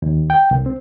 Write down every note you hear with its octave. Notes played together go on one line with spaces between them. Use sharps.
D#2
G5
C2
C4